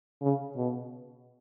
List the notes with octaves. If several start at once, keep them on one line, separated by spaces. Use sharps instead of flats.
C#3
B2